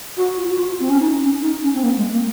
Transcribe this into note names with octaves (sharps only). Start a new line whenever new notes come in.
F#4
F4
F#4
F4
C4
C#4
D#4
C#4
D#4
C#4
C4
A#3
G#3
A#3